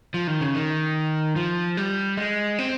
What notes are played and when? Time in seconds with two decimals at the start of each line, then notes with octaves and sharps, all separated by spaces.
0.14 F3
0.27 D#3
0.41 C#3
0.55 D#3
1.36 F3
1.77 G3
2.17 G#3
2.59 C4